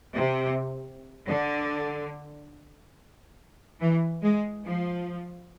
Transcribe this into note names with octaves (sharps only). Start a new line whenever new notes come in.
C3
D3
E3
G#3
F3